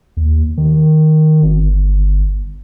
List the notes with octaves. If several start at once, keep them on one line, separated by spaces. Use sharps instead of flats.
D#2
D#3
G1